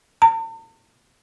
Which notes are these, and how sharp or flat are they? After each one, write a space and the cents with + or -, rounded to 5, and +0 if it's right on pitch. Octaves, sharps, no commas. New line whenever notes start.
A5 +45